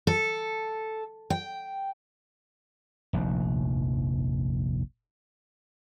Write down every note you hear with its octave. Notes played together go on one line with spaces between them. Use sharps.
A4
G5
F1 A#1 D#2